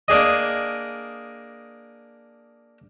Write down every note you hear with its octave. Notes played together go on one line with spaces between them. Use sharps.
A#3 D4 G#4 D#5